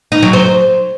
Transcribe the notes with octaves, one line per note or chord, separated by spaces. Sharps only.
D#4
F#3
C5